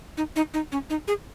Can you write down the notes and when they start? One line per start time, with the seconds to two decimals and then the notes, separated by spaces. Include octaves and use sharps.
0.17 D#4
0.36 D#4
0.54 D#4
0.72 C#4
0.90 D#4
1.08 G#4